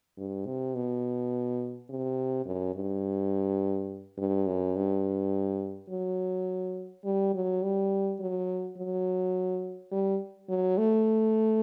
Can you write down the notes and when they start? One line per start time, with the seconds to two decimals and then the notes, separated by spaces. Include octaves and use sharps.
0.18 G2
0.46 C3
0.75 B2
1.90 C3
2.46 F#2
2.76 G2
4.18 G2
4.47 F#2
4.76 G2
5.90 F#3
7.05 G3
7.34 F#3
7.63 G3
8.20 F#3
8.78 F#3
9.92 G3
10.49 F#3
10.78 A3